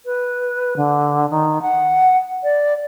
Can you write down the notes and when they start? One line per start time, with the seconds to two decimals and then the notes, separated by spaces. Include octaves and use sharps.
0.05 B4
0.77 D3
1.30 D#3
1.62 F#5
2.43 D5